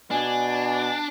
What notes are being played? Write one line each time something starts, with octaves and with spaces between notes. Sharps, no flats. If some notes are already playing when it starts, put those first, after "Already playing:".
B2 D4 G#5